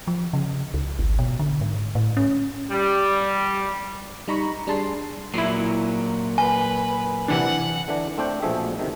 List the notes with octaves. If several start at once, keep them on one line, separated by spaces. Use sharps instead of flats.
F3
C#3
C#2
G#1
B2
D3
G#2
A2
C#4
G3
G3 D#4 A#5 B5 C#6
G3 D4 G#4 A5 C6 C7
A#2 F#3 E4 C7
B4 G#5
C3 E3 D4 F#5
D3 E3 D4
A3 C4 D4 C5 G5
A#1 B2 F3 A3 G#4 E5
D2 C3 D#3